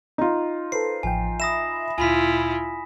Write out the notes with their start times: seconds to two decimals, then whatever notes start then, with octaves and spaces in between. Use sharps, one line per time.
0.18 D#4 F4
0.72 A4 B4 C5 C7
1.03 A1 F3 G5 G#5
1.40 E5 B5 D#6 A#6 E7
1.98 D2 A#2 E4 F4 G#5 B5 B6